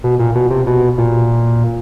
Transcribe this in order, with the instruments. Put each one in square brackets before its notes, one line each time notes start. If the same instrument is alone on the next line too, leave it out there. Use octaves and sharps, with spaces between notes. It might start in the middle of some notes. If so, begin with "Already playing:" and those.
[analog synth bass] B2
A#2
B2
C3
B2
A#2